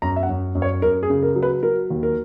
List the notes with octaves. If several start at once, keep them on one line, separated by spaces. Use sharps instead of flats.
F#2 A#5
E5
F#5
F#2
F#2
C#5
F#2 A#4
G#4
C#3
A#4
F#3
B4
F#3 A#4
D#2
A#4